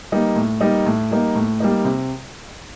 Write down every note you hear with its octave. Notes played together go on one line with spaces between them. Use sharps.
G3 A#3 D#4
A2
G3 A#3 D#4
A2
G3 A#3 D#4
A2
G3 A#3 D#4
C3